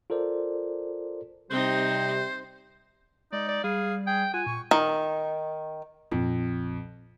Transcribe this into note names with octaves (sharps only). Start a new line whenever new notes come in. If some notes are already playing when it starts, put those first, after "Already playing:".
F4 A4 A#4 C5 D5
C3 G3 C4 D#4 C5
G#3 D#4 D5
D5
G3 G#4 F5
G#4 G5
F4 F#5 G#5
A#2 C#6
D#3
A#1 F2